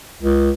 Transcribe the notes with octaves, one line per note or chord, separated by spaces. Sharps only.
C#2